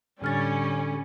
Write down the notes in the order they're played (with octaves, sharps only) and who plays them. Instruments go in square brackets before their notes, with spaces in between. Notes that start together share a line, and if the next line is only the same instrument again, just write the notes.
[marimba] A2 F6 A6 [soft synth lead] D3 [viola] G3 [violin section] C#4